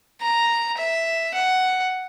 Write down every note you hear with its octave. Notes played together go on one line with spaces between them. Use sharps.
A#5
E5
F#5